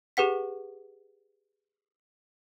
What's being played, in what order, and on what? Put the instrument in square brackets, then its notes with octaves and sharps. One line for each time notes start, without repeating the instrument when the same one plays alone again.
[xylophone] G4 G#4 B4 F#5 B6